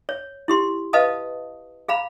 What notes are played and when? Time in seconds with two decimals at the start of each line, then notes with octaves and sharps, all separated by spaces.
0.09 C#5
0.48 E4 G4 C6
0.93 B4 D#5 F5 A5 D#6
1.88 G#4 F5 A#5 B5